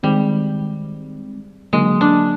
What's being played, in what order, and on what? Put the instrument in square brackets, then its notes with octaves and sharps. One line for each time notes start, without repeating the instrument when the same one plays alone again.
[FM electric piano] D#3 G#3 C4 [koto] G3
[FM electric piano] D3 F#3 A#3 [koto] G#3
[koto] D4